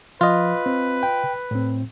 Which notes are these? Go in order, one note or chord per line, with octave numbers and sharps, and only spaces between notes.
F3 F4 B4 D#5
C4
G5
A2 C4